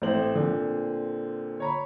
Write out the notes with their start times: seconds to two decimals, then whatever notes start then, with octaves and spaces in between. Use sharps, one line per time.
0.02 A1 A3 C4 C5 F#7
0.34 A#2 D3 C4
1.60 C#5 A#5 B5